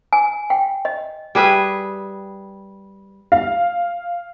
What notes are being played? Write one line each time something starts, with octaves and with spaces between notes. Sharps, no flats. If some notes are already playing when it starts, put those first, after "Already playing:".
G#5
G5
D#5
G3 G#4 B4 E5
F5